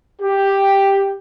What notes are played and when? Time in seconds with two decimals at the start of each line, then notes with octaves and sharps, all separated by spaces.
0.22 G4